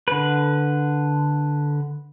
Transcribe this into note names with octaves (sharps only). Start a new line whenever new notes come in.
D3 B4